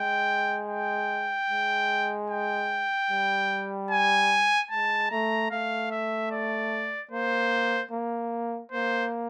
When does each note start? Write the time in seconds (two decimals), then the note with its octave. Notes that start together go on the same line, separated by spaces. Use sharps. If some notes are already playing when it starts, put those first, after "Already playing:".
Already playing: G#3 G5
0.70 G5
1.50 G#3
2.30 G5
3.11 G3
3.91 G#5
4.71 G#3 A5
5.11 A3 A#5
5.51 A3 F5
5.91 E5
6.31 D5
7.11 A#3 C5
7.91 A#3
8.72 A#3 C5